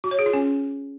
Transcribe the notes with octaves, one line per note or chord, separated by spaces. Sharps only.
F#4
C#5
G#4
F4
C#4